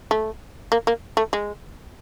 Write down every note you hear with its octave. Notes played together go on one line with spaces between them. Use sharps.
A3
A#3
A#3
A3
G#3